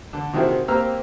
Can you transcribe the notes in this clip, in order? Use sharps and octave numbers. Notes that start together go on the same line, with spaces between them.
D3
C3 D#3 C4 E4 F#4 G#4
A#3 C4 G4 A#5 E6 F6